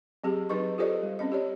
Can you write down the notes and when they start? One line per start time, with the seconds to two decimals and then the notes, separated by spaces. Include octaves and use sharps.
0.24 F#3 C4 G4 G#4
0.49 F#3 D#4 B4 D#5 C#6
0.78 F4 G4 A4 C5 D5 D#5
1.03 G3
1.19 C4 C#4 D#5
1.32 G4 C#5 D5